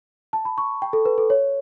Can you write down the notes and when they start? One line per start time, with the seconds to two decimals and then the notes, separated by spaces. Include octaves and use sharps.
0.33 A5
0.45 B5
0.58 C#6
0.82 G5
0.93 A4
1.05 B4
1.18 A4
1.30 C#5